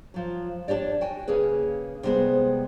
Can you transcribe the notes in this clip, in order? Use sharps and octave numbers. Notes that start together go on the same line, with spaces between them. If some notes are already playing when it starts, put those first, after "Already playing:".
F3 F#3
D4 G4 C#5 D5
F#4 G5 G#5
C#3 A#3 C#4 G#4 B4
C3 G3 G#3 B3 G#4 C5